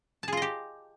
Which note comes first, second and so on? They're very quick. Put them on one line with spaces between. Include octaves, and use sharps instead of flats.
A5 G#4 F4 D#5 G4